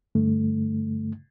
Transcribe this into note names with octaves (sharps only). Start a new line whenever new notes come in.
G2 D3 A3